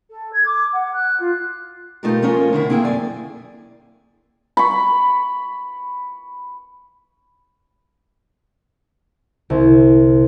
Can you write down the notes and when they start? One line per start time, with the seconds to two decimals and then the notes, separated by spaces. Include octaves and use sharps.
0.10 A4
0.33 G#6
0.46 D6
0.73 F#5
0.93 F#6
1.20 F4
2.03 B2 A3 D#4 F4 G4 A#4
2.22 F3 A3 C#4 F4 A#4 C#5
2.53 D3 D#3 E4
2.70 A#3 C4 E4 G#4 G5
2.84 F#2 D5 G#5
4.57 B5 C#6
9.50 C2